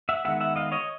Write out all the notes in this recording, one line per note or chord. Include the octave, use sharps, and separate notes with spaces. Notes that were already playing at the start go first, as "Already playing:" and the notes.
E5 F#5
D#3 G#3 B3 E5 F#5
E5 F#5
D#5 F5
C#5 D#5